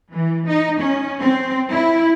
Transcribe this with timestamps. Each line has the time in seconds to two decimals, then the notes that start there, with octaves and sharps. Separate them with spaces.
0.13 E3
0.48 D#4
0.80 C#4
1.21 C4
1.72 E4